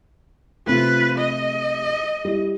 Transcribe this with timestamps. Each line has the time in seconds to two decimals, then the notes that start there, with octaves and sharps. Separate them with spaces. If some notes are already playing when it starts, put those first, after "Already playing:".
0.67 C3 A3 F4 B4
1.18 D#5
2.25 G3 E4